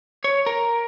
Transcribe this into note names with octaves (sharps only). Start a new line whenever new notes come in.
C#5
A#4